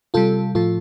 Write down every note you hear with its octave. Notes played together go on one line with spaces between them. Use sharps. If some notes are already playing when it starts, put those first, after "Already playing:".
C3 G3 F4 A4
A2 F3 F4 A4